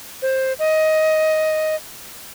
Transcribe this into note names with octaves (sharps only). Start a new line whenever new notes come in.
C5
D#5